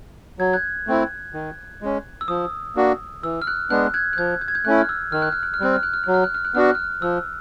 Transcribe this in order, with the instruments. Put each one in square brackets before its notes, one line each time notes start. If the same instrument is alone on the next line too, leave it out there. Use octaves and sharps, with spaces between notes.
[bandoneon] F#3 [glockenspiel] G#6
[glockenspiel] F#6 G#6
[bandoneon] A3 C4 E4
D#3
G#3 C#4
[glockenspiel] E6
[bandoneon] F3 [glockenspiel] D#6
[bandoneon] A#3 D4 F#4
[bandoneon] E3 [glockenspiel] E6
[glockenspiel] F6
F#6
[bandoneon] G#3 B3 D4 [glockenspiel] F#6
[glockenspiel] F#6 G#6
F#6
[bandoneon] F3 [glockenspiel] G6
[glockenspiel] G6
G#6
G6
[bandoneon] A3 C#4 E4 [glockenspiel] F#6
[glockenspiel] F6
E6
[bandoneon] D#3 [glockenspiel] F6
[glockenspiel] F#6
F6
F#6
F6
[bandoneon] G3 C4 [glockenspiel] F#6
[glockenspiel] F6
F#6
F6
[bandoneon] F#3 [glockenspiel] F#6
[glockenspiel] F6
F#6
F6
F#6
[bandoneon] B3 D4 F#4 [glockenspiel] F6
[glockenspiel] F#6
F6
[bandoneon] F3 [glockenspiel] E6